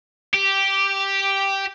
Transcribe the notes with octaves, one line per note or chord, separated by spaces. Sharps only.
G4